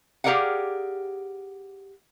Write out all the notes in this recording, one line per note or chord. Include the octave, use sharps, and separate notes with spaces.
G4 G#4 A#4 D5 F5 F#5